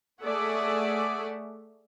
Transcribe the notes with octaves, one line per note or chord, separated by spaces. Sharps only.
A3 G#4 C#5 D5 E5 F#5